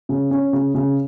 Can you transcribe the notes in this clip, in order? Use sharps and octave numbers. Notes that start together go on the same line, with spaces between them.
C#3
C#4
C#3
C#3